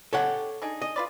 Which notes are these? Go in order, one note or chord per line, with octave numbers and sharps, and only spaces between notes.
C#4 G4 A4 C#5 F#5
D4 D#4 G#4
D#5
F4 B4 D5